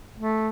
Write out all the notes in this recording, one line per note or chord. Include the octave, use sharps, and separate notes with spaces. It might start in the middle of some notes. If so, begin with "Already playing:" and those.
A3